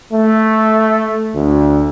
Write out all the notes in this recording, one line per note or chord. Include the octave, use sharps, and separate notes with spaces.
A3
D2